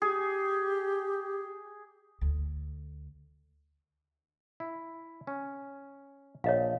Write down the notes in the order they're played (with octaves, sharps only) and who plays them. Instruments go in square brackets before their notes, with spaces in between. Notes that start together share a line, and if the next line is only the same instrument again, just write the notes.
[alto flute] G4 [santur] G#4
[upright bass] D2
[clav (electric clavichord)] E4
C#4
[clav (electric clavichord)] A#1 [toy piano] C#5 D#5 F5